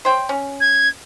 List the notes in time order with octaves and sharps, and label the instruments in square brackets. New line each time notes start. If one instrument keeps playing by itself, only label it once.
[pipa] C5 C#5 G5
C#4
[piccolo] G#6